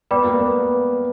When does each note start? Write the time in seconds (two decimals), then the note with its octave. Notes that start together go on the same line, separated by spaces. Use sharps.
0.11 B3 B4 D5 G5 B5 D6
0.24 A#3
0.38 B3